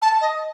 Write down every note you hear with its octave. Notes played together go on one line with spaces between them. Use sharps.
A5
D#5